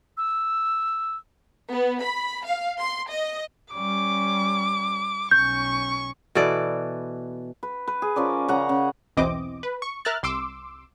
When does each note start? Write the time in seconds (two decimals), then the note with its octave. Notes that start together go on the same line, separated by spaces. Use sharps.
0.17 E6
1.70 B3
2.02 B5
2.44 F5
2.80 C6
3.11 D#5
3.74 G3 C#4 D6
5.31 B1 C#4 C#6 G6
6.35 B2 E3 A4 D5
7.63 B4
7.87 B4
8.02 G#4
8.16 F3 C#4 A#4 D5
8.48 C#3 F#5 A#5
8.69 C#3
9.17 B1 E2 E3 C4 D#5 D6
9.63 B4
9.82 C#6
10.05 A#4 E5 F6 F#6 A6
10.23 C2 C6 D6 E6